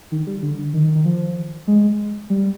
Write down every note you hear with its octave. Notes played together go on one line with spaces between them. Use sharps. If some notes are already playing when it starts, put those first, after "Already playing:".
D#3
G3
D3
D#3
D#3
D#3
F3
G#3
G3